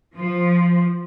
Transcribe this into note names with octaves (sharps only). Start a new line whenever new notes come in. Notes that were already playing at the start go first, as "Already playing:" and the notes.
F3